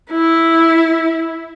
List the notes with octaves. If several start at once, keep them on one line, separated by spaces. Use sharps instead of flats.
E4